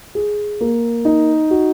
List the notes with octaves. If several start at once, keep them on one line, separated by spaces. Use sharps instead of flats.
G#4
A#3
D#4
F#4